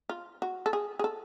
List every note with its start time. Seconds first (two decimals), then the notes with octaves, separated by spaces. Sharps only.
0.09 F4
0.42 F#4
0.66 A4
0.73 G#4
0.99 G#4
1.04 A4